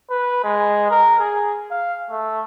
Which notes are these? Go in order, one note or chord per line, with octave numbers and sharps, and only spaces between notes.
B4
G#3
A#4
G#4
F5
A3